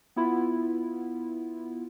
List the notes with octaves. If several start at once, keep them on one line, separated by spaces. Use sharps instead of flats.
B3 E4 F4